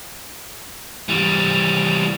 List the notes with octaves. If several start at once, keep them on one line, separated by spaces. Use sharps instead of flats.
E3 G3